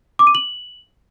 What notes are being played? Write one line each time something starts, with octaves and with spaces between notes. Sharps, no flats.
D6
D#7
F#7